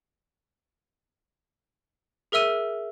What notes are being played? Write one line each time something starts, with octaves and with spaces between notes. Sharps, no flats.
G#4 A#4 E5 E6 D#7